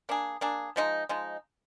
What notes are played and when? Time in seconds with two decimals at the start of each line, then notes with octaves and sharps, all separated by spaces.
0.09 A#3 D4 G#4
0.41 A#3 D4 G#4
0.76 F3 G#3 D#4
1.09 F3 G#3 D#4